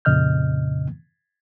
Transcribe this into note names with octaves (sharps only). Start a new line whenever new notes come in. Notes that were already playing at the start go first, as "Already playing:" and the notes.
F2 A#2 C#3 D#5 F6 G6